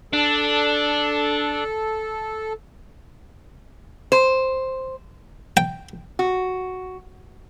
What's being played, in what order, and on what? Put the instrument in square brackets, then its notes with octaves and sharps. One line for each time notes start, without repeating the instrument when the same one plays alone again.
[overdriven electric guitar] D4 [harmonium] A4
[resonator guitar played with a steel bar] C5
[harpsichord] G5
[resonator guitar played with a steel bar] F#4